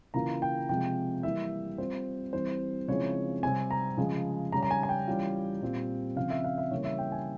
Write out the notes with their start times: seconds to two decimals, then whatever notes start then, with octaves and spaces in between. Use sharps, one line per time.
0.14 C#3 E3 A#3 F4 A#5
0.42 G5
0.69 C3 F3 G#3 G5
1.23 E3 G3 A#3 E4 E5
1.78 G3 C4 F4 C5
2.33 E3 G3 C4 C5
2.88 C#3 F3 G#3 C4 E4 C#5
3.43 C3 G3 C4 G#5
3.71 A#5
3.97 C#3 F3 G#3
4.52 C#3 G3 C#4 A#5
4.63 A#5
4.71 G#5
4.83 G#5
4.89 G5
5.08 E3 G3 C#4 F4
5.61 A#2 G3 C4 F4
6.16 C#3 F3 C4 F5
6.30 E5
6.44 F5
6.58 E5
6.71 C#3 E3 G3 A#3 C#5
6.85 E5
6.98 G5
7.12 G#5